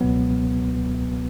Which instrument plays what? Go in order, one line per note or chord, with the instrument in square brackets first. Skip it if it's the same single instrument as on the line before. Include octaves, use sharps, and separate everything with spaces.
[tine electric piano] C#2 B2 F#3 B3